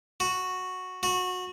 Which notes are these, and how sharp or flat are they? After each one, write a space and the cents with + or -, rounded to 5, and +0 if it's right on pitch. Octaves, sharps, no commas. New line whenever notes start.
F#4 -5
F#4 -20